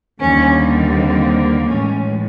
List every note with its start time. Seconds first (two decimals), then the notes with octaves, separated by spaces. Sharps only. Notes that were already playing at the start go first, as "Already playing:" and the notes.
0.21 D#2 D3 G3 A#3 C#4
0.94 C4
1.69 A2 E3 G#3 C#4